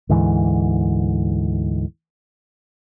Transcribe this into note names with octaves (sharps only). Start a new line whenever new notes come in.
D2 G#2 E3